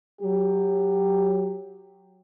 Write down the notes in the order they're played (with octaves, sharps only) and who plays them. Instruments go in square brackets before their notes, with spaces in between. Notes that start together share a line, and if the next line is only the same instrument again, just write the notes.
[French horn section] F#3 G4